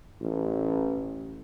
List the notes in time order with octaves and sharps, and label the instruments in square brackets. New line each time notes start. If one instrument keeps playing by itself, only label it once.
[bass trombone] A1